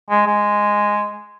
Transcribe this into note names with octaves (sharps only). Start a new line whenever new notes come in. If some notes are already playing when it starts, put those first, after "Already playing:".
G#3
G#3